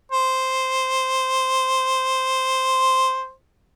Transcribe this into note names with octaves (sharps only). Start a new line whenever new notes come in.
C5